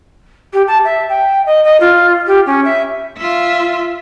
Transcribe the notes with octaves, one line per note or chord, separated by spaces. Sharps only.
G4
A5
E5
G5
D#5
D#5
F4
G4
C#4
E5
F4 E5